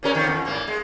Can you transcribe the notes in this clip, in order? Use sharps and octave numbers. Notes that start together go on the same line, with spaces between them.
A#2 C#4 A#4
F2 D#3
E2
G#2 A#3
G#3